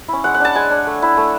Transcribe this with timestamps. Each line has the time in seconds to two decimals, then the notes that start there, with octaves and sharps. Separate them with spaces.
0.08 C#4 E4
0.24 G#3 F#5
0.34 F#5
0.40 D4 A5
0.55 G#3 G#5
0.70 D4
0.87 A3
1.02 E4
1.17 A3